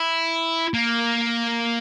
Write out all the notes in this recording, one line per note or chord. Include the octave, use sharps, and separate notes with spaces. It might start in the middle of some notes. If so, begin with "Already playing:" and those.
Already playing: E4
A#3